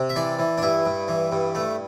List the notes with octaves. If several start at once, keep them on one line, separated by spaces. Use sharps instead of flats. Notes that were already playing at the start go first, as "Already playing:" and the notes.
Already playing: C3
E5
E3 D5
E3
D4
G2 E4
G2
E3
G2
A3